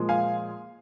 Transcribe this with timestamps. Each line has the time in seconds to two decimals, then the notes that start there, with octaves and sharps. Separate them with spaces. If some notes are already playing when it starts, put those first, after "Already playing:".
Already playing: A#2 F3 G#3
0.09 F5 G#5